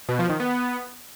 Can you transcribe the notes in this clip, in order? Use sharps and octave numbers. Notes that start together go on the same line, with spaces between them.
B2
F3
D#3
B3